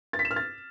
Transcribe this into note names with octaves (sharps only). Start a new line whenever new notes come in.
A6
B6
E7
F6
A6